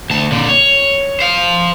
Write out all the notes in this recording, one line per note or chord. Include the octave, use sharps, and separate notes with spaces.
D2 A5
A#2 D3
C#5
C5 F5